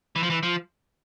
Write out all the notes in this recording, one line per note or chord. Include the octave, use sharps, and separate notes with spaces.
E3
F3
E3
F3